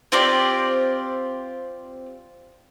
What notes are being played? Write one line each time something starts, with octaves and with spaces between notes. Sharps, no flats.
C4 F4 G4 D5